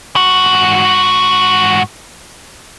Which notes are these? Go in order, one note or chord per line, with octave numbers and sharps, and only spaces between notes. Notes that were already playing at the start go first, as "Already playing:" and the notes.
G#2 F#4